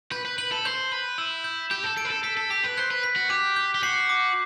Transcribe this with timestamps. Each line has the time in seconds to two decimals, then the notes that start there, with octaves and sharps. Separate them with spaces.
0.12 B4 G6
0.25 B4
0.38 B4 F#7
0.52 A4
0.65 C5 G6
0.92 B4 G6
1.18 E4 E6
1.44 G6
1.71 G4 G6
1.84 A4
1.97 A4 D7
2.05 B4
2.11 A4
2.23 A4 B6
2.37 A4
2.50 G4 B6
2.64 B4
2.77 C5 F#6
2.91 B4
3.03 B6
3.16 F#4
3.29 G4 D6
3.56 G6
3.75 G4
3.83 F#4 C7
4.09 D6